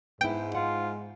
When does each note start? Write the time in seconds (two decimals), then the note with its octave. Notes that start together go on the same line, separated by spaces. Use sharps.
0.21 G#2 B3 E4 G5
0.55 F4 F#5